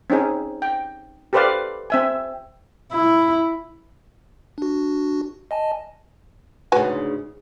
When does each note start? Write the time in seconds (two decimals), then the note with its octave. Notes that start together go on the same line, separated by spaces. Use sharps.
0.10 C4 C#4 D#4 G#4
0.62 G5
1.33 G4 A4 B4 C5 D5 F5
1.90 C4 E5 G#5
2.92 E4
4.58 D4 F#4
5.51 D#5 G#5 A5
6.72 D2 G#2 C#3 F#4 B4 G#5